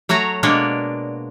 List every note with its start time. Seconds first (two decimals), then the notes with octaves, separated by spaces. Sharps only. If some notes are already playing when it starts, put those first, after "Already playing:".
0.09 F#3 A3 F#4 C#5 A#5
0.43 B2 G#3 A#3 D4 C#5 D5